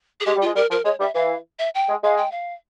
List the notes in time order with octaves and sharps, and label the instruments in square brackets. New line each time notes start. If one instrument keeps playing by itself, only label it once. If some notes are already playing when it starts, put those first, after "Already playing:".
[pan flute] G#4
[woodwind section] G#3 [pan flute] G4
[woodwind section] G3
[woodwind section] G#3 [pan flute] F4
[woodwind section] G3 [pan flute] A#4
[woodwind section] F3 [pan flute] A#4
[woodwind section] G#3 [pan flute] C#5
[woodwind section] G3 [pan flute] E5
[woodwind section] E3 [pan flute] F5
[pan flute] E5
G5
[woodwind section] G#3
[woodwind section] G#3 [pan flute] F5
[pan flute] G5
F5